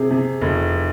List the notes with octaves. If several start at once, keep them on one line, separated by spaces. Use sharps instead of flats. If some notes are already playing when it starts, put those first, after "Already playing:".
Already playing: C3 G#4
C3
F1